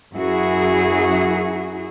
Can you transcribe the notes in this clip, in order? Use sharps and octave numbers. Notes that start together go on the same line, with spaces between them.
F#2 E4 F#4 G#4